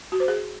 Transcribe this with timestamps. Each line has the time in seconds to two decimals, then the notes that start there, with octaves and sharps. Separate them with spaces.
0.12 F#4
0.20 C5
0.28 G#4